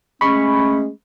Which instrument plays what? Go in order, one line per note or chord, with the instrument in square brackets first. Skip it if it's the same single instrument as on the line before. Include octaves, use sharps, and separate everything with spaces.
[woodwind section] G#3 A3 C#4 [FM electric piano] B5 C#6